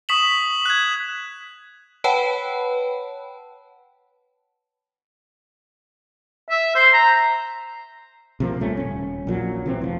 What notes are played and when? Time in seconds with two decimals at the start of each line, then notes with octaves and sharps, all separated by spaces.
0.09 C#6 D#6 B6 E7 F#7
0.66 F#6 G#6
2.04 B4 C#5 F#5 G5 A5 B5
6.50 E5
6.75 C5
6.94 A#5
8.40 C3 F3 A#3
8.60 C2 A#2 A3 C#4
8.77 D#1 C#4
9.27 A#1 A#2 F#3
9.66 C3 E3 C4
9.81 F1 C#3 F3